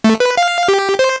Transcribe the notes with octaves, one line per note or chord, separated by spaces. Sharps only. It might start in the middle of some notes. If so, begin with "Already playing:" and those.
A3
B4
F5
G4
C5